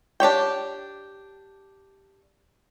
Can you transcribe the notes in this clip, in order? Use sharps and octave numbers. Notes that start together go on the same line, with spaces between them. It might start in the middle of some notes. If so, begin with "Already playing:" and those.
D4 G4 C#5 G5